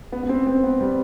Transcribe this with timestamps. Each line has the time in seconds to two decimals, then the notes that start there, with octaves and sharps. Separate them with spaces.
0.12 B3
0.23 B3
0.29 C4
0.47 C4
0.63 B3
0.81 G3